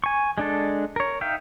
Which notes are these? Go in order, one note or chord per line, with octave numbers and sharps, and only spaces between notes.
G#5 C#6
G#3 D4 A4
A#4 C#5
D#4 E5 F5 G5